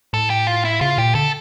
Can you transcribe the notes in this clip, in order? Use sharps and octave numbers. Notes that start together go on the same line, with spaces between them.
A2 A4
G4
F4
E4
C#3 F4
A#2 G4
D3 A4